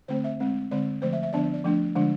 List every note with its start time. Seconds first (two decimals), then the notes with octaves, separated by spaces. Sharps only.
0.08 D3 A3 C4 C5
0.24 E5
0.40 G#3 C4
0.71 D3 G#3 C4 D5
1.02 D3 F3 A3 C5
1.13 E5
1.23 E5
1.33 D3 F3 B3 D4 D5
1.54 D5
1.64 F3 A3 D4
1.95 D3 F3 G#3 D4